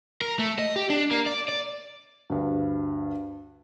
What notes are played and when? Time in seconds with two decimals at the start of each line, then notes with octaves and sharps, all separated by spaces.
0.22 A#4
0.39 A3
0.59 D#5
0.76 G4
0.90 D4
1.11 A#3
1.26 D5
1.48 D5
2.30 D2 G2